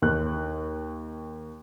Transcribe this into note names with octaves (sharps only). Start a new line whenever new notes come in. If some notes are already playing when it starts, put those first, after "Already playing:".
D#2 F#6